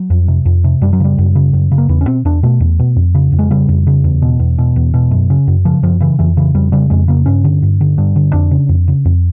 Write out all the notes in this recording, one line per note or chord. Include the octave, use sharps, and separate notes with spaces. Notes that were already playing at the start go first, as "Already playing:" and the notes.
Already playing: F#3
F2
C3
F2
C3
F#2 G3
F#3
C#3 G3
F#2
C#3
F#2
C#3
A#3
E2 B3
C#4
B2 C4
E2 D4
B2 A3
E2
B2
F2
C#3
F2
G#3
C#3 G3
F2
C#3
E2
B2
E2
B2
E2
B2
F#2
C#3
F#2
C#3 F3
F#2 F3
C#3 E3
F2 E3
C#3 E3
F2 G3
C#3 G3
F2 G#3
C#3 A#3
G2 C#4
D3
G2
D3
G2
D3
F2 D4
C#3
F2
C#3
F2